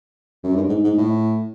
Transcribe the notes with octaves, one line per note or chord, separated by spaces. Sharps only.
F#2
G2
G#2
G#2
A2